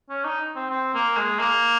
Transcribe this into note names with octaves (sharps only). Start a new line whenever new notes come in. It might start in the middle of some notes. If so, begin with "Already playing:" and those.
C#4
D#4
C4
C4
A#3
G#3
A#3